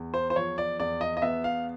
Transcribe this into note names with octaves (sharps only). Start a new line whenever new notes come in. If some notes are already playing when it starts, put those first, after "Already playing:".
Already playing: E2
C5
C5
F3 C#5
D5
E2 D5
D#5
D#5
B3 E5
F5